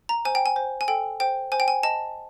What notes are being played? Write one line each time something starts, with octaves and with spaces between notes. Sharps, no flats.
A#5
C5 G#5
G5
G#5
C5
G#5
A4 G5
C5 G5
C5 G#5
G5
G#5
D#5 A5